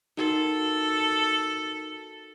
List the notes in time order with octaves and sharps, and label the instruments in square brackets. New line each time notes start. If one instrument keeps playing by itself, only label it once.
[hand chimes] D#4 F#4 A#4 [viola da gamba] A4